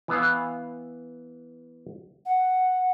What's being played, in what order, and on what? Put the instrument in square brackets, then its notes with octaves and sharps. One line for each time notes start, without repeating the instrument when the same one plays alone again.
[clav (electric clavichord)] E3 B3 F5
[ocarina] F#5